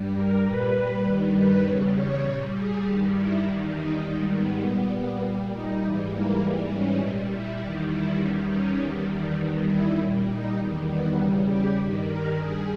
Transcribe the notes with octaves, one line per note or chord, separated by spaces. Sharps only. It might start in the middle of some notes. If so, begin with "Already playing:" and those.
Already playing: G2 G3
A#4
A#2 G3 B4
G2 D#3 G3
B4
E2 C#3 G3 C#5
C#5
A#2 G3 C#5
G#4
G2 D#3 G3 G4
E4
E2 D#3 G3
D#4
G#2 D#3 G3 A#3
B3
A#2 G3 B3
A#2 G3
D#4
G#2 E3 G3 G4
A#3
G#2 E3 G3
C#4
A#2 G3 D#4
E4
E2 D#3 G3 G4
E4
E2 D#3 G3 C#4
C#4
E2 D#3 G3
E2 D#3 G3 B3
E4
A#2 G3 C#4
D#4
E2 D#3 G3
B3
E2 C#3 G3 D#4
G4
G2 D#3 G3
A#4
G2 G3 G#4